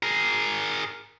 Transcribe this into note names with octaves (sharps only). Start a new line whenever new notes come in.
G#4 A#4